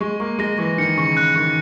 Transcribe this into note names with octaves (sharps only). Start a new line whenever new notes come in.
G#3 C#6
A#3 C#6
G#3 A#6
E3 C#6
D#3 C#7
C#3 C#6
F#6
D#3 C#6